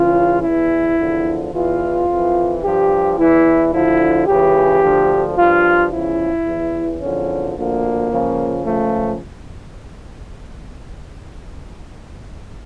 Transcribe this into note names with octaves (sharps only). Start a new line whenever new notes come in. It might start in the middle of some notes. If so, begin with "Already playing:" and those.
Already playing: C#2 C#3 E3 F4
E2 E3 E4
E2 D3 F3
E2 E3 F4
F2 E3
G2 F3 G4
E2 E3 E4
D2 D3 F3 E4
C#2 C#3 E3 G4
D2 D3 F3
G2 F3 F4
E2 C#3 F3 E4
E2 E3
E2 D3 F3 C#4
D2 D3 F3 A#3
C#2 C#3 F3
C#2 C#3 F3 A3